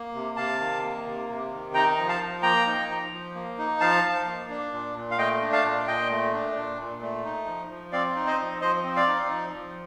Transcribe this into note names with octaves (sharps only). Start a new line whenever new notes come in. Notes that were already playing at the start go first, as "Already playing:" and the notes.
Already playing: A#3
C3
C3 F5 A5
D#3
A#3
C3
C3
D#3
D#4 G5 A#5
F3
F5 A5
F3
A#3 G5 A#5
D#4
F3
F3
A#3
D#4
F3 F5 A5
F3
A#3
D4
A#2
A#2
F5
A3 D#5 G5
D4
F5 A5
A#2
A#2 D#5 G5
A3
D4
A#2
A#2
A3
D#4
F3
F3
C4 D5 F5
D#4
C5 D#5
F3
F3 C5 D#5
C4
D5 F5
D#4
F3
F3